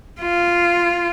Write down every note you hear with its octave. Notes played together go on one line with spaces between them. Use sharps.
F4